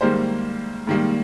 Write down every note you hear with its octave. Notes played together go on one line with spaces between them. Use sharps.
G#2 D#3 G3 A#3 C5
G#2 D#3 G3 A#3